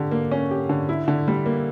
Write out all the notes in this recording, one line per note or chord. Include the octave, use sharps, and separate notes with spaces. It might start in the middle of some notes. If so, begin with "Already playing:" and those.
Already playing: D3 G4
A#3
C#4
G4
D3
E4
D3
G3
A#3